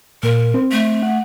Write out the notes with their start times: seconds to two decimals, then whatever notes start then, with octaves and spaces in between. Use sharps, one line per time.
0.23 A#2 A#4
0.54 C4
0.72 A3
1.03 F#5